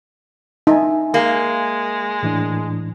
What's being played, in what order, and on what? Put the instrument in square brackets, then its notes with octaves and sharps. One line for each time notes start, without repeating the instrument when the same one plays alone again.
[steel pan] D#4 [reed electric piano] E5 G#5
[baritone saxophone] G#3 [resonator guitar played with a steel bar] A#3
[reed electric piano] A2 E3 D4